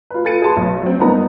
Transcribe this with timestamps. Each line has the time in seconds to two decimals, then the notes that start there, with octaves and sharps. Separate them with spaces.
0.10 F4 B4
0.24 F4 A4 B4 A6 C#7 D#7
0.42 G#4 B4 A5 C6
0.57 B1
0.82 F#3 C4
0.99 G1 A#3 B3 D#4 A#5